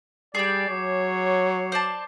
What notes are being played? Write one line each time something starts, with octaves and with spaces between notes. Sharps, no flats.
G3 G#4 D5 G5 D6 C7
F#3 C#5
C5 D5 A5